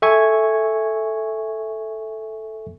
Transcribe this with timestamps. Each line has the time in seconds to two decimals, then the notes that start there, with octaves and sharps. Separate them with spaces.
0.02 A4 E5 G#5 C#6 G#6